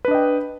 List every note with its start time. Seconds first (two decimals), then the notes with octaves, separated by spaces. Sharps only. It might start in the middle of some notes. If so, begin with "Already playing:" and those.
0.05 B4
0.08 D4
0.11 D#5
0.15 G5